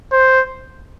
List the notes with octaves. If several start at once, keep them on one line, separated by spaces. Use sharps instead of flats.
C5